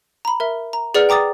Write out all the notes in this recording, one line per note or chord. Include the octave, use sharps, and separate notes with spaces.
A#5 B5
A#4 E5
A#5
G#4 B4 D5 F#5 F6
G5 A#5 D6 D#6 A6